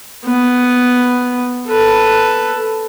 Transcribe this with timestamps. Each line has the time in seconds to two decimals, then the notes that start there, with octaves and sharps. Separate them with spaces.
0.25 B3
1.68 A4 B4